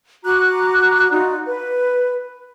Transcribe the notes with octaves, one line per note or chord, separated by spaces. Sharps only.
F#4 A#5 D6 F#6
D#4 F4 F#4 D5
B4